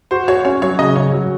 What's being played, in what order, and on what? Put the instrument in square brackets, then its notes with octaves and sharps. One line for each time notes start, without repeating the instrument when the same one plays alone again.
[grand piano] F#4 [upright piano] C5
[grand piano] F#4 [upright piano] C#5
[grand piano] C#4 [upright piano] C#5
[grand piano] F#3 [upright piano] C#5
[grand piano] C#3 [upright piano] D#5
[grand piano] C#3 [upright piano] C#5
[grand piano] F#3